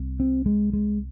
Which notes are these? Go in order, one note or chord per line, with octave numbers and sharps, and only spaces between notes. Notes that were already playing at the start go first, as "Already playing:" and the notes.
Already playing: C2 C3
C4
G#3
G#3